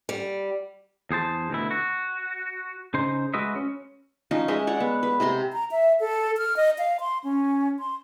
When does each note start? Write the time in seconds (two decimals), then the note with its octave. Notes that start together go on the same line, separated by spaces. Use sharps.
0.09 G3
1.11 E2 G#4 C5 A5
1.50 D2 B2 E4
1.71 F#4
2.94 C#3 D#4 C5
3.34 G#3 F#4 B4 D#5 E5
3.56 C#4
4.31 F3 C#4 D#4 D#5
4.48 G#3 D#5 E5
4.67 C#5 D5 F#5
4.80 B3
5.03 B4
5.20 C3 D#5 A#5 C6
5.53 A#5
5.71 E5
6.00 A4
6.38 F6
6.57 D#5
6.78 F5
7.00 C6
7.24 C#4
7.79 C6